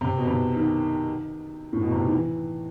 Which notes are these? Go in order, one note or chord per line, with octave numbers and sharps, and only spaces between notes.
C3
B2
C3
D#3
A2
B2
C3
D#3
E3